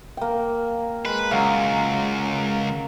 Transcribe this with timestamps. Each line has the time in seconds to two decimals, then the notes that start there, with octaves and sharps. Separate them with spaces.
0.17 A#3 G5
1.05 G#3 B4
1.31 C#2 F#3 F5